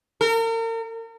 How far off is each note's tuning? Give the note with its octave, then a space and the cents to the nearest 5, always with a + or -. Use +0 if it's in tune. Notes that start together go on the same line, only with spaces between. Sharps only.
A#4 -40